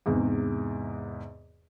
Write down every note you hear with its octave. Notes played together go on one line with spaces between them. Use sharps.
E2 G#2 C3